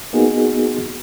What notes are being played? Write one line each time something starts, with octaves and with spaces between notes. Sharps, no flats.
A#3 B3 D#4 F#4 G#4